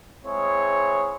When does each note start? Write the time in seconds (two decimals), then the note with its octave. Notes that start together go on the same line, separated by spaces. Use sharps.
0.25 G#3 C4 E4 G#4 C#5